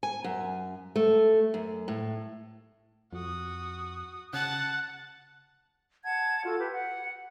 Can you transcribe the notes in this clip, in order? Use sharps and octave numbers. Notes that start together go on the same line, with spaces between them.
G#5
F#2
A3
F#2
A2
F2 F#4 D#6
C#3 F#5 A5 F#6
F#5 A5 G#6
F4 F#4 A4
G4 B4
F#5